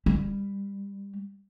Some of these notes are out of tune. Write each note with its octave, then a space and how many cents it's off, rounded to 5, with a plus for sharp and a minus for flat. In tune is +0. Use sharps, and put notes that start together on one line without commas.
G3 +20